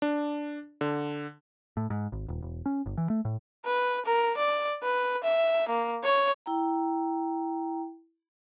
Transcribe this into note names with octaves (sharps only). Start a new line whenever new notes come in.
D4
D3
A2
G#2
G#1
D#1
E1
C#4
G1
E3
A3
A2
B4
A#4
D5
B4
E5
A#3
C#5
E4 G5 A#5